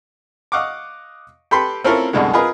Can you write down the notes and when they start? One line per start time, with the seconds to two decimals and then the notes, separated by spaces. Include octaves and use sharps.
0.52 D#5 F5 F#5 C#6 D6
1.51 G4 A4 B4 B5 C6
1.84 C4 C#4 E4 F4 A4 A#4
2.13 C2 F#2 B2 D3 G#3
2.33 F4 G#4 A#4 B4 D#5